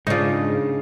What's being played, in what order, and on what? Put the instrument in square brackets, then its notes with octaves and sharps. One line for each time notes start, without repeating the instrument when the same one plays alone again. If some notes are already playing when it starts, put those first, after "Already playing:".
[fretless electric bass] G#2 [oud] C#3 D4 [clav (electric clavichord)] D#4 F4